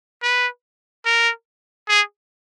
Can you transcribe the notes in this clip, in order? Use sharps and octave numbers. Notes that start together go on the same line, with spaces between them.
B4
A#4
G#4